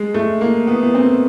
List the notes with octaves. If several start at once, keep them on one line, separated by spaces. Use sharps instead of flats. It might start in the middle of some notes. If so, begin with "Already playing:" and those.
Already playing: G#3
A3
A#3
B3
B3
C4